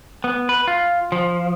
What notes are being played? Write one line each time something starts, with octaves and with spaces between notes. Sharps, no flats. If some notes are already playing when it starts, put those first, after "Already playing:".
B3
B4
F4
F3